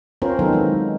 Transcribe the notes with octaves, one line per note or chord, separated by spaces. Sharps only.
C4 C#4 F4 A#4 C5
D#3 F#3 B3 D#4 F4 A4
E3 G#3